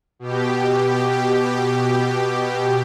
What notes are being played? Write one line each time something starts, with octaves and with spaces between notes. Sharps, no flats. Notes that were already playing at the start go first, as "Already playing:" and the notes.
B2 G4